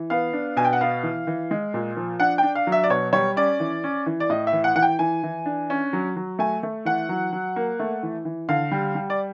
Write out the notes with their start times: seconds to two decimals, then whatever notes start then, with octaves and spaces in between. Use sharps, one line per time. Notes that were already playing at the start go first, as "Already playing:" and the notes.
Already playing: E3
0.10 B3 F5
0.33 D4
0.57 B2 G#5
0.65 G5
0.73 F#5
0.81 B3 F5
1.03 E3
1.27 E3
1.51 G#3
1.74 A#2
1.97 F3
2.20 D4 F#5
2.38 D4 G5
2.55 F5
2.67 F#3
2.72 E5
2.84 D5
2.90 B2 C#5
3.13 G3 C#5
3.36 C#4 D5
3.60 E3
3.84 C#4
4.06 E3
4.20 D5
4.30 A2 D#5
4.47 E5
4.53 E3
4.64 F#5
4.76 E3 F#5
4.82 G5
4.99 E3 G#5
5.23 E3
5.46 D4
5.70 C#4
5.93 F#3
6.16 F#3
6.39 A3 G#5
6.63 A3
6.85 E3 F#5
7.09 F#3
7.33 F#3
7.56 A#3
7.80 A3
8.03 E3
8.25 E3
8.49 D3 F5
8.71 G3
8.95 G3
9.10 D5